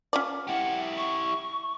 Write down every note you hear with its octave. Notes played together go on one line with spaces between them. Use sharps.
C#4 F4 D5
E4 G4 F#5
C#6